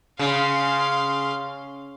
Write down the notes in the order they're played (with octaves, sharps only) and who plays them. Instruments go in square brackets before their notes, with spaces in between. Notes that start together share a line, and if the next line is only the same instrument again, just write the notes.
[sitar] C#3 [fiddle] F5 C6